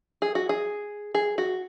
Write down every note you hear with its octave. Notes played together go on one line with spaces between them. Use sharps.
G#4
F#4
G#4
G#4
F#4